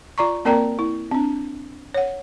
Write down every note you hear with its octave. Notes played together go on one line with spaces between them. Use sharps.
F4 D5 A#5 C#6
A#3 C4 A#4 D5 G5 A#5
E4
C4 D4
C#5 F#5